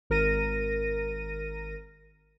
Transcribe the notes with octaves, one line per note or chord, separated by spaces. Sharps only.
G#1 A#4 A#6 D#7